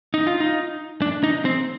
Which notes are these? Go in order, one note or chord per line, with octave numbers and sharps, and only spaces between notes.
D#4
F4
D#4
D4
D#4
C4